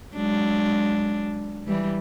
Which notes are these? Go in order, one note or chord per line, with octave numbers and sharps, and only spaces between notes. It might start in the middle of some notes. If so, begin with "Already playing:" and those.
F#3 G#3 D4
E3 G3